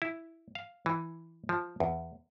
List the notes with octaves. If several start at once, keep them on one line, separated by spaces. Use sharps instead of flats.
E4
F5
E3
F3
E2